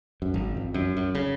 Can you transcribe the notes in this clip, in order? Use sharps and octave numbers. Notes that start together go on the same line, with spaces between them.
F#2
G#1
F2
F#2
F#2
C#3